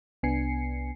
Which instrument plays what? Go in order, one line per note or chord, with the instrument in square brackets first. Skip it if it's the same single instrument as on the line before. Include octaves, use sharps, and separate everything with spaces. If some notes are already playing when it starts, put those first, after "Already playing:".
[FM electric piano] C2 B3 D4 G#5 C7 C#7